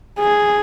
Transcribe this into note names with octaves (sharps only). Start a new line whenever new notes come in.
G#4